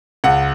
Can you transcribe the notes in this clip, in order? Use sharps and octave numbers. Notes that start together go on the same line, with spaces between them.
C#2 F#5